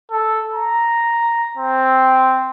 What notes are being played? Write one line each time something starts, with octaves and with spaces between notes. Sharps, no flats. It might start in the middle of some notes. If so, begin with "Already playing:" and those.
A4
A#5
C4